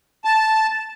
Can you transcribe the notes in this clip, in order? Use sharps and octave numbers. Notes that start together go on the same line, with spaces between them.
A5